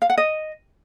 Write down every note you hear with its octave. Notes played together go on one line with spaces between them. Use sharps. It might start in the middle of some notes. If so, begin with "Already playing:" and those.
F5
F#5
D#5